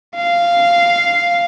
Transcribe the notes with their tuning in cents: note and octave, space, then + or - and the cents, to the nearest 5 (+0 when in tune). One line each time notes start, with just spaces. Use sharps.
F5 -10